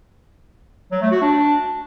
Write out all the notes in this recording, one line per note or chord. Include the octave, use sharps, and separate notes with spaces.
F#3
A3
F#4
D4